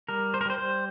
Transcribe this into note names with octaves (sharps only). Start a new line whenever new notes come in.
G3 A#4
C5
A#4
G3 C5
C5